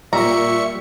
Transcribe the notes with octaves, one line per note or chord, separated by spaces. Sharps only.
A#2 G3 E5 A#5 C#6 C#7